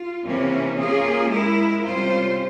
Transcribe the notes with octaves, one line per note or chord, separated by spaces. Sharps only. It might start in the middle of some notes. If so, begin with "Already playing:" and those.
Already playing: F4
C3 E3 A#3 C#4
A#3 C#4 F4 G#4
G#3 E4 A#4
C3 G3 C#4 F4 C5